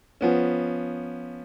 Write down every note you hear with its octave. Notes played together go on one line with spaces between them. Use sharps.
F3 B3 C#4